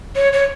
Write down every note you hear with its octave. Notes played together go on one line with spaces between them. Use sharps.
C#5
C#5